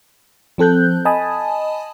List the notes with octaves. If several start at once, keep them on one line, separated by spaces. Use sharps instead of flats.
F3 C4 A4 F#6 G6
D#5 G#5 A5 B5 D#6